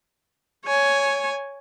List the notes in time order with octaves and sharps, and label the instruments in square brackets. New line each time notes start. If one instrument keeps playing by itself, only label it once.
[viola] C#5 G#5